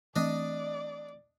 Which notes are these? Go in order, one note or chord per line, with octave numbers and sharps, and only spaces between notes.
E3 A3 C4 D4 D5 D#5